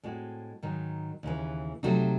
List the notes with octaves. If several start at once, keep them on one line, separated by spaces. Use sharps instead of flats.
A2 G#3 C4 F#4
G#2 D#3 F#3
D#2 C#3 E3
C3 F#3 A3 D#4 F#4